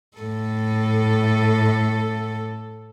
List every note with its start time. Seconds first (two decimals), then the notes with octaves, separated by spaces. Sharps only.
0.17 A2 A4